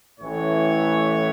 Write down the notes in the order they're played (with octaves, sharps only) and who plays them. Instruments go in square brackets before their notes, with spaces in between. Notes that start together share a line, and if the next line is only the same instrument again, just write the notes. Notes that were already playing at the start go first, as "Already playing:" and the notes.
[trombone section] A1 A2 E3 [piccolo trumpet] C#5